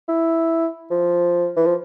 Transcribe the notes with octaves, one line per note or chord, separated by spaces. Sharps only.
E4
F3
E3
F3